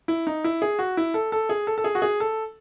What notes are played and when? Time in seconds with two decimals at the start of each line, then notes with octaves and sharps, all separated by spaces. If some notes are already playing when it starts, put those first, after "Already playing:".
0.08 E4
0.27 D#4
0.44 E4
0.62 G#4
0.79 F#4
0.97 E4
1.14 A4
1.32 A4
1.49 G#4
1.67 A4
1.78 A4
1.84 G#4
1.95 F#4
2.02 G#4
2.20 A4